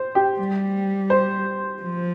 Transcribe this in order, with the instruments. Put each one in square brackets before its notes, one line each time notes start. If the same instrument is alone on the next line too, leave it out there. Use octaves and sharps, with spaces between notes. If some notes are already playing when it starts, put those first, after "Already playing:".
Already playing: [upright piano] C5
G4
[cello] G3
[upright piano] C5
[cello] F3